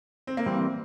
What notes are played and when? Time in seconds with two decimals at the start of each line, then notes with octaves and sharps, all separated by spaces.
0.27 C4
0.37 A#3
0.46 E3 G3 C4